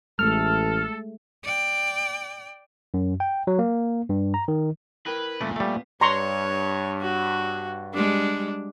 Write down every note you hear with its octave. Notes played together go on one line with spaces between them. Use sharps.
A1 G#3 A3 A4 F6
D5 G5
F#2
G5
F#3
A#3
G2
A#5
D#3
E4 A#4 B4 G5
G2 A#2 C#3 A3 B4 D5
G3 A3 B3 F5
G2 C#5 A#5 C6 C#6
F#4
G3 G#3 D4